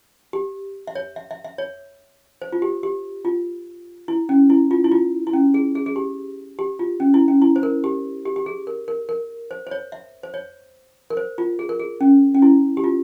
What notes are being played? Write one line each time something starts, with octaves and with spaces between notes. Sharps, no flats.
G4
E5
C#5
E5
E5
E5
C#5
C5
F4
G4
G4
F4
E4
C#4
E4
F4
E4
F4
E4
C#4
G#4
G#4
G#4
G4
G4
F4
C#4
E4
C#4
E4
C5
A#4
G4
G4
G4
G#4
A#4
A#4
A#4
C5
C5
C#5
E5
C5
C#5
A#4
C5
F4
G#4
A#4
G#4
C#4
C#4
E4
G4
F4